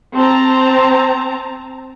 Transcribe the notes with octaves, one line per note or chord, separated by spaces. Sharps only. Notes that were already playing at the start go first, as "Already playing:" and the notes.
C4 A5 A#5